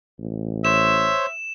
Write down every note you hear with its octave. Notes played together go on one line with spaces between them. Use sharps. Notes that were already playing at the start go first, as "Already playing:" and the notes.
A1
C5 C#5 E5 E7